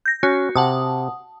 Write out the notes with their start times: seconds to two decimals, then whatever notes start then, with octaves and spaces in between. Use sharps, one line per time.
0.06 G6 A#6
0.23 C#4 F#4
0.56 C3 F#5 A5 D#6